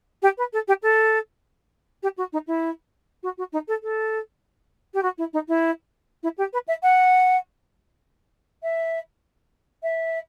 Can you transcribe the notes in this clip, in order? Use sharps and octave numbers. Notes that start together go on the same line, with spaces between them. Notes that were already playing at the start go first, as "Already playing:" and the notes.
G4
B4
A4
G4
A4
G4
F#4
D#4
E4
F#4
F#4
D#4
A4
A4
G4
F#4
E4
D#4
E4
E4
G4
B4
E5
F#5
E5
E5